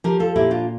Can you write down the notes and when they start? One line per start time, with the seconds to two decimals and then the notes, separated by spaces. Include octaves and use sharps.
0.04 F3 G4 A#4
0.20 F4 A4
0.36 A#2 E4 G4
0.51 D4 F4